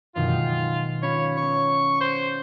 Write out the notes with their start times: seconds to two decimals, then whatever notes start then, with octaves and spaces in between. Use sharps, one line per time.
0.15 F#2 B2 D#3 F4
0.28 D#3 G#3
1.02 C#4 F4 C#5 B5
1.37 B3 C#5 C#6
2.01 C5